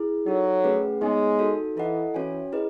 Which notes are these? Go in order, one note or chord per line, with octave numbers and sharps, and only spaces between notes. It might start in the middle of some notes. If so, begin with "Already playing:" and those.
Already playing: E4 G#4
F#3 D#4 A4 C#5
A3 C#4 G#4 B4 F#5
G#3 B3 D#4 G#4 C#5 G#5
D#4 F#4 A4
E3 E4 A4 D#5 F#5
E3 C#4 F#4 C#5 G#5
E4 G#4 B4 D#5